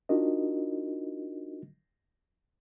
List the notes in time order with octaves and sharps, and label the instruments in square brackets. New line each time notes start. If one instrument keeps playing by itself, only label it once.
[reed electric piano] D4 D#4 F4 F#4 A#4 D#5